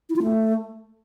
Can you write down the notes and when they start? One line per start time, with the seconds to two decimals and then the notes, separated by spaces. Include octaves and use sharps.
0.10 E4
0.16 F4
0.23 A3